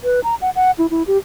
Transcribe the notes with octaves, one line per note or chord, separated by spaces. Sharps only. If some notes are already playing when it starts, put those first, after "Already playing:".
B4
A#5
F#5
F#5
E4
E4
G4